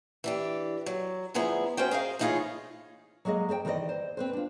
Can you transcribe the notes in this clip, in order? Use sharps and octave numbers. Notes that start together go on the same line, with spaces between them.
E3 D4 G4
F#3
D2 F3 B3 E4 G#4 A#5
C#4 F#4 C5 G5
G#4 A#4 D#5 F5
A2 E3 D#4 F4 G#4 C#5
F#3 G#3 A#3 G#4 D#5
G#4 C5 D#5 G5
D#3 E3 A#4 C5 D5 D#5
C5
C4 B4 C5
D4 F4